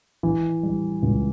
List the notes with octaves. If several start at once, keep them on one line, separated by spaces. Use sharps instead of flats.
E3
G3
C#2